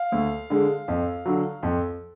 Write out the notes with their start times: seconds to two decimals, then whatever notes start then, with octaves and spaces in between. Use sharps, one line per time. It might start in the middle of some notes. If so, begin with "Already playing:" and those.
Already playing: F5
0.12 D2
0.50 D3 G#3
0.88 F2
1.26 D3 F#3
1.63 F2